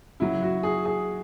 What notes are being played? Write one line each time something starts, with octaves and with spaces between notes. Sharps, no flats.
C#3 F#3 E4
F#4
G#4
G#4